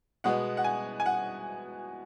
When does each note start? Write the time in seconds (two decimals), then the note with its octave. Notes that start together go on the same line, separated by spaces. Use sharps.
0.24 B2 G#3 B3 F#5
0.57 F#5
0.64 G#5
1.00 G#5
1.06 F#5